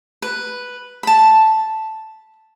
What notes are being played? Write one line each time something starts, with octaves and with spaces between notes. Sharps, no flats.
B4
A5 B5